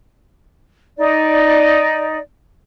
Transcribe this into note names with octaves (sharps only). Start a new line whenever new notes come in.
D#4 D5